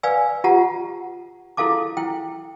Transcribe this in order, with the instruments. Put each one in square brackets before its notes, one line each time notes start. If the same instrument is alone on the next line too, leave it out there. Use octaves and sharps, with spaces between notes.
[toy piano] B4 D5 F5 G#5 E6
F4 G4 F#5 A5 A#5
E4 G#4 A4 F5 A5 D6
E4 G5